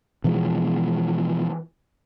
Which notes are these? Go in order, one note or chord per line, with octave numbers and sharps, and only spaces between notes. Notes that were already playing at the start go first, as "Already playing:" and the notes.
B2 E3 F3 G#3